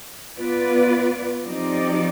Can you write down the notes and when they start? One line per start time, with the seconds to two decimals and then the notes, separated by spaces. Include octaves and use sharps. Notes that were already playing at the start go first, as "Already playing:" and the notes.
0.39 B3 F4 B4 D5
1.45 F3 C4 D#4 G4 D5